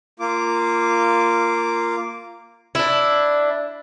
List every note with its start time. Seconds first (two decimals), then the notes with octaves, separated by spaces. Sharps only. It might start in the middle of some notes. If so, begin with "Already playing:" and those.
0.20 A#3 F4 D6
2.75 D4 E4